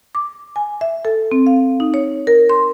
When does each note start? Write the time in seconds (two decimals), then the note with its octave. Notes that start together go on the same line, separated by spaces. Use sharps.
0.15 D6
0.56 G#5
0.81 E5
1.05 A4
1.32 C4
1.47 F5
1.80 D#4
1.94 C#5
2.27 A#4
2.49 C6